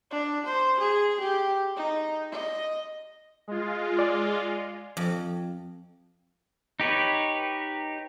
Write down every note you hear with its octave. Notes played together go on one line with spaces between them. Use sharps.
D4
C5
G#4
G4
D#4
D#5
G#3 F4
D5 G#5 D6
F2
D#4 G4 B4 C#5